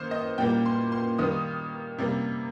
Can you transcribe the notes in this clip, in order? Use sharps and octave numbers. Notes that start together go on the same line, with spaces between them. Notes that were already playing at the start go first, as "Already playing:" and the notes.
Already playing: D#3 A#3 C5
D#5
A#2 G3 A#3 G5
C6
C6
D#3 G3 A#3 D#6
C3 G3 A#3